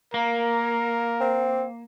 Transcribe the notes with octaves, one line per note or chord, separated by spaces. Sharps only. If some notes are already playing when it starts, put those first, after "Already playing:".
A#3 A#4
C4